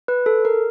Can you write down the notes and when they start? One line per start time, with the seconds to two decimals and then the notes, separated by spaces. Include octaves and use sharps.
0.08 B4
0.26 A4
0.45 A#4